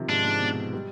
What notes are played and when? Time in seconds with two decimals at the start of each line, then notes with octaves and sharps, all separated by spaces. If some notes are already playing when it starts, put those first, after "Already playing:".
Already playing: C3 D#3 F3
0.08 G#2 D4
0.25 G#2
0.40 B2
0.73 G3